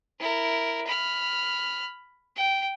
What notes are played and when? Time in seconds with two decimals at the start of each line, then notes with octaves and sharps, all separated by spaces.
0.20 E4 A#4
0.87 B5 F6
2.36 G5